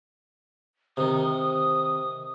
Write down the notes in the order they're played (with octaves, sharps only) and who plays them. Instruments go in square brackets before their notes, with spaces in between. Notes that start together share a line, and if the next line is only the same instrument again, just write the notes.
[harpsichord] C3 D#3 [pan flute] D#6